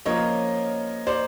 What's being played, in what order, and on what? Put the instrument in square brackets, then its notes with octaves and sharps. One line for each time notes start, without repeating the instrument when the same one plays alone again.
[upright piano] F3 A#3 C#4 F4 A#4 [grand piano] C#5 D#5
[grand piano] C5 D5